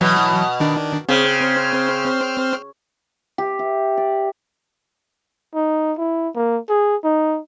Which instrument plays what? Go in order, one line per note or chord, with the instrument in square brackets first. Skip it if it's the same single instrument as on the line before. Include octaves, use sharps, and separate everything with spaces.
[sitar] B2 [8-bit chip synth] E3 F#3
[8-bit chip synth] D#3 D4
[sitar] C#3 [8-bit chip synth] C4 C5 F6
[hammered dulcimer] G4
E5
D5
[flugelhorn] D#4
E4
A#3
G#4
D#4